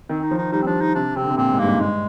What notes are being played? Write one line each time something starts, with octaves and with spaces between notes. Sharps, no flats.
D#3 C4
D#4
F3
D#4
G3 D#4
C4
F3 D4
D#4
C3 D4
C3 C4
D3
C3
A#2 C4
G#2
G2 A#3
G#2
G2 G#3